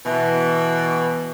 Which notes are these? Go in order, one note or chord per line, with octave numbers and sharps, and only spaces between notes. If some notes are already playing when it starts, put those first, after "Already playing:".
B2 E3